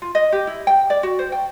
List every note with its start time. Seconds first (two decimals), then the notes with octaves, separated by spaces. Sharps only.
0.02 F4
0.15 D#5
0.32 G4
0.47 E4
0.67 G5
0.90 D5
1.03 F#4
1.19 C5
1.32 G5